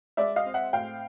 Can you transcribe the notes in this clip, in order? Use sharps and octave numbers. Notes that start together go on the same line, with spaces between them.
G#3 D5 E5
D#5 F5
C4
E5 F#5
A2 F5 G5